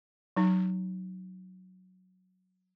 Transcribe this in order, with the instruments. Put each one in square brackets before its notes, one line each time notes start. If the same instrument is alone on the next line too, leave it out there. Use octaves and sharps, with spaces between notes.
[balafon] F#3 D#4